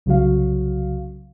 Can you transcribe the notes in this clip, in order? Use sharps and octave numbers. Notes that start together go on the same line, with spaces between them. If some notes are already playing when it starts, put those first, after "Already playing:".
C2 C#3 F#3 F#4 F5